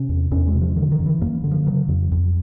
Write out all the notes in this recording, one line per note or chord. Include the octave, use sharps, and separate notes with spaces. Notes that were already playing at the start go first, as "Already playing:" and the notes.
Already playing: C3 C#4
E2
E2 C#4
G#3
C3
F3
D3 D#3
D#3
F#2
E3
F#2 A#3
D3
F3
C#3 F#3
F2
F2